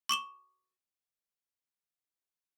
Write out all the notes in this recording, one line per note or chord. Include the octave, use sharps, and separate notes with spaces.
C#6 D6 E7 G7